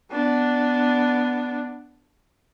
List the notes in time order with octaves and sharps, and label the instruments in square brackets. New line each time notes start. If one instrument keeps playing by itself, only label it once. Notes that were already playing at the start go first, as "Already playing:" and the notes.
[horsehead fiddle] B3 D4